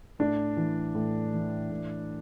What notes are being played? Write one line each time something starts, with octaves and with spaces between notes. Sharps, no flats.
A2 D4
E3
A2
E3
A2